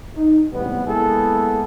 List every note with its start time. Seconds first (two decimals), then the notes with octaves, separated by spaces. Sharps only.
0.16 D#4
0.53 A1 G#2 C3 G3 B3
0.86 G#3 A#3 B3 E4 G#4 A4